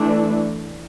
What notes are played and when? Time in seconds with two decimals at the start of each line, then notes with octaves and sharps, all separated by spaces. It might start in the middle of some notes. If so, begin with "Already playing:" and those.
Already playing: E3 A3 D4